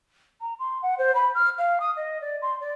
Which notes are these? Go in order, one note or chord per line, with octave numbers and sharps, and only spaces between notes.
A#5
C6
F#5
C5
B5
F6
F5
D#6
D#5
D5
C6
D5